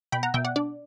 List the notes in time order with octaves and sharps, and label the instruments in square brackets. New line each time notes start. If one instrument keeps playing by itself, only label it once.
[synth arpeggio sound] B2 G5 B5
F#5 A#5
B2 E5 G5
D5 F#5
D4 D5